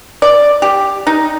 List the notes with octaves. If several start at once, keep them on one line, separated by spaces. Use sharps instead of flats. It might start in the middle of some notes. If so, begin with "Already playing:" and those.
D5
G4
D#4